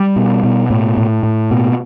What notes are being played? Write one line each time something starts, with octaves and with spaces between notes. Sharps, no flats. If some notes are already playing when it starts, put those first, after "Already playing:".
Already playing: G3
B2
B2
A2
A2
A2
B2